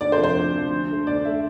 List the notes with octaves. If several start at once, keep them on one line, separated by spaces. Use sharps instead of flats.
D2 D5
C5
C3 F3
C5
D2
C3 F3
D2
D3 A3
D2 D5
D3 A3 E5